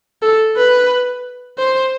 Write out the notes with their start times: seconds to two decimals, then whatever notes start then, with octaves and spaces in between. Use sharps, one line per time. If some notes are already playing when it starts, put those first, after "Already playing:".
0.22 A4
0.57 B4
1.58 C5